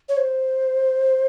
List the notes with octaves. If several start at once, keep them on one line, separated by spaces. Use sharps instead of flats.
C#5
C5